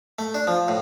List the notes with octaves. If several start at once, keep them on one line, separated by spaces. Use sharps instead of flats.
A3
D4
F3
A2